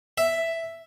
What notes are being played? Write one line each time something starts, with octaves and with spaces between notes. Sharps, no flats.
E5